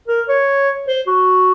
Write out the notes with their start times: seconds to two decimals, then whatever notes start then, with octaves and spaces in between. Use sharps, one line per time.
0.08 A#4
0.29 C#5
0.88 C5
1.07 F#4